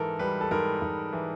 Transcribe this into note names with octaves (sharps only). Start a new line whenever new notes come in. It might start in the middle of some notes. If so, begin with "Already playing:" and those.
Already playing: G#2 E3 A4 A#4
G3 B4
A4
G#2 A#4
G#2
E3